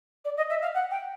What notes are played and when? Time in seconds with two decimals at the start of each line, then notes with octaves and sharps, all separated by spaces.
0.25 D5
0.37 D#5
0.50 E5
0.62 F5
0.74 F#5
0.91 G5